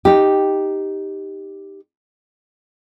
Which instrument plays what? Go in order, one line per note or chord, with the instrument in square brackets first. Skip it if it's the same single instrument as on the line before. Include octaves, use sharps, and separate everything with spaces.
[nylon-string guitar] D#4 G4